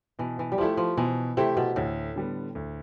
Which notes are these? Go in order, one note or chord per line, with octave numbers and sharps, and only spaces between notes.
B2 E3
E3
G3
F3 A3 E4 G4
F3
B2 E3
C3 A3 E4 G4
B2
D2 A2
D3 G3 B3
D2